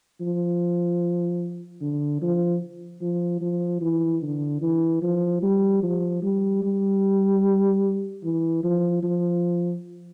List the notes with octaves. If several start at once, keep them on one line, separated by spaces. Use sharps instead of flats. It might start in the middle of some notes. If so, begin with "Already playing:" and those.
F3
D3
F3
F3
F3
E3
D3
E3
F3
G3
F3
G3
G3
E3
F3
F3